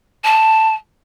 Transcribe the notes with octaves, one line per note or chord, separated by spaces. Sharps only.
A5